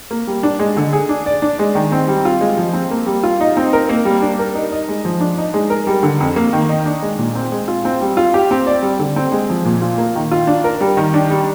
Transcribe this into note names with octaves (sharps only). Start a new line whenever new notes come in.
A#3
G3
D4
G#3
D3
G#4
D4
D5
D4
G#3
D#3
C4
G3
F4
G#3
F3
C4
A#3
G3
F4
D#4
C4
A#4
A#3
G3
D4
A#4
D#4
D#5
G#3
F3
D4
D#4
G#3
A#4
G3
D3
F2
A#3
D#3
D#4
D4
G#3
A#2
C4
G#3
F4
C4
G3
F4
G4
C4
D5
G3
D3
C4
G#3
F3
A#2
F4
A#3
D#3
F4
D4
A#4
G3
D#3
D4
G3